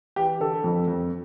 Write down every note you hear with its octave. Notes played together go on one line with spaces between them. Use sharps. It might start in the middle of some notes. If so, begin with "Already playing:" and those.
E3 G4
D3 A4
F2
F2